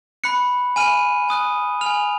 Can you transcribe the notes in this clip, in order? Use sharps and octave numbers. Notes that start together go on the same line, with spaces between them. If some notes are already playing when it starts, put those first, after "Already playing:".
B5 F#6 C#7
G#5 B5 F6 D#7
G#5 D#6 F#6
G#5 B5 F6 F7